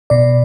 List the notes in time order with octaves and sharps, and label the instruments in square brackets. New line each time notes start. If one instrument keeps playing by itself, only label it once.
[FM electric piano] B2 D5